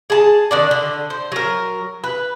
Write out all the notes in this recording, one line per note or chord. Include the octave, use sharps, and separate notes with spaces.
G#4 A5
D#3 D4 D5
D3
C5
F#3 A#4
B4